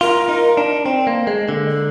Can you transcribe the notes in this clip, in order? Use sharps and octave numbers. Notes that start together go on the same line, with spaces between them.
F4 A#4
D#4
D4
C4
A#3
G#3
D3
A#4